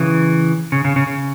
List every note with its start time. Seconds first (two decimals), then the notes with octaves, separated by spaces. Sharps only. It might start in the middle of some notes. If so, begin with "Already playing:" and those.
Already playing: C#3 E3
0.72 C#3
0.85 C#3
0.96 C#3
1.07 C#3